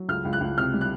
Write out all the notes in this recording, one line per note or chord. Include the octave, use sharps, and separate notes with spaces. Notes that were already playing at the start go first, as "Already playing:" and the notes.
Already playing: F#3
C#2 F6
C#2
F#6
C#2
C3 F6
G3
F#6